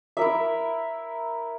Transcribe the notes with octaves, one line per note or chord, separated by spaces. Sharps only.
E4 A#4 E5